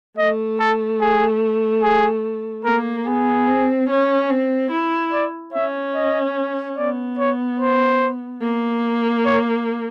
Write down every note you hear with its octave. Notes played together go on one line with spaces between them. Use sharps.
A3 D#5
A4
G#4
G#4
A#3 A#4
B3 G#4
C4
C#4
C4
E4
D5
C#4 E5
D#5
B3 D5
C#5
C5
A#3
C#5